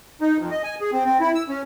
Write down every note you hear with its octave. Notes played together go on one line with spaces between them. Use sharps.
D#4
F2
D#5
G#5
G#4
C4
C4
E4
E6
C#4